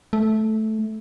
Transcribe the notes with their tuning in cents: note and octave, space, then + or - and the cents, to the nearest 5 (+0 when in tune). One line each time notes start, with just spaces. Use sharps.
A3 -10